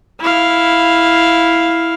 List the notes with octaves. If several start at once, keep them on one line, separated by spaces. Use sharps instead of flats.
E4 F5